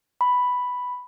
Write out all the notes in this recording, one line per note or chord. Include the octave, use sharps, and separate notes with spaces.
B5